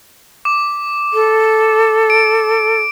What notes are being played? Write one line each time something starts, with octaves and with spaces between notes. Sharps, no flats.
D6
A4
D7